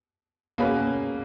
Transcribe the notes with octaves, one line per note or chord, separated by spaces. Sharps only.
B2 A#3 C#4 G#4 B4